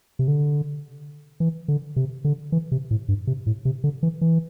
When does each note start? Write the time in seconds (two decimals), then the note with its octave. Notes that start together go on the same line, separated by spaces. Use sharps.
0.19 C3
0.28 D3
1.40 E3
1.68 D3
1.96 C3
2.25 D3
2.52 E3
2.72 C3
2.91 A2
3.08 G2
3.27 C3
3.46 A2
3.65 C3
3.84 D3
4.03 E3
4.21 E3